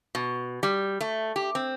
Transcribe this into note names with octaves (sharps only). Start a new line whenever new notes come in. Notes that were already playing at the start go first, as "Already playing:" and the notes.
B2
G3
A3
G4
C4